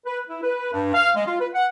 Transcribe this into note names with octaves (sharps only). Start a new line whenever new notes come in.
B4
E4
B4
G2
F5
G#3
F4
B4
F#5